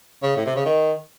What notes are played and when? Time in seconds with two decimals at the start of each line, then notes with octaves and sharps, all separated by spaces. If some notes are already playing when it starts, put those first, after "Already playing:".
0.22 C#3
0.36 A2
0.46 C3
0.56 C#3
0.65 D#3